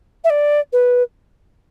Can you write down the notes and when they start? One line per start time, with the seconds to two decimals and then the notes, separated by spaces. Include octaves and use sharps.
0.24 E5
0.30 D5
0.72 B4